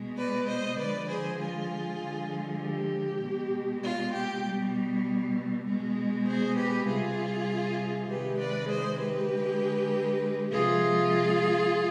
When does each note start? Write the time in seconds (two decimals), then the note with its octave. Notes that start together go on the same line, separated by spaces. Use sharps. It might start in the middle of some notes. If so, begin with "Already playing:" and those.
Already playing: B2 G#3
0.17 B4 D5
0.47 C5 D#5
0.78 D3 F3 G#3 B4 D5
1.08 G#4 C5
1.39 F4 G#4
2.00 D3 F3 G#3
2.60 G4
3.21 B2 G#3
3.83 F4
4.13 G4
4.43 B2 G3
5.65 B2 G#3
6.26 G#4 C5
6.56 G4 B4
6.86 C3 G3 F4 G#4
8.08 C3 D#3 G#3 G4 B4
8.39 B4 D5
8.69 G#4 C5
9.00 G4 B4
9.31 D3 G#3
10.51 C3 F3 G#3 F4 G#4